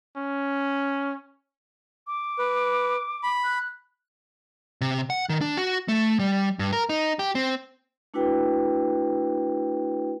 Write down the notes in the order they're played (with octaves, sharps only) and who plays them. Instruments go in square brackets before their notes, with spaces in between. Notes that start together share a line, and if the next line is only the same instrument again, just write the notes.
[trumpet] C#4
[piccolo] D6
[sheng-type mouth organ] B4
B5
[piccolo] F#6
[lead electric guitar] C3
F#5
D#3
D4
F#4
A3
G3
G2
A#4
D#4
G4
C4
[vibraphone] A3 D4 E4 F#4 B4 G5